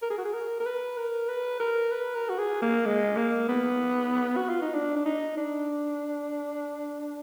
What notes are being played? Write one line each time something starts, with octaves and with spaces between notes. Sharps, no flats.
A#4
G#4
F#4
G#4
A#4
A#4
B4
A#4
B4
A#4
B4
A#4
F#4
G#4
A#3
G#3
A#3
B3
F#4
F4
D#4
D4
D4
D#4
D4